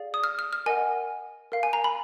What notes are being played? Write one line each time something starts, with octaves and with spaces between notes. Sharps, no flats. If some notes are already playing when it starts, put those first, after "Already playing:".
Already playing: G#4 D5 F5
D#6
F6
F6
F6
A#4 D#5 F#5 G#5
A#4 F5
G#5
A#5
B5